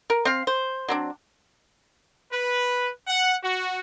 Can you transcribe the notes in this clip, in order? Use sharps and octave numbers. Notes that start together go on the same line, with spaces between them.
A#4
C4 F5
C5
F#3 C4 D4
B4
F#5
F#4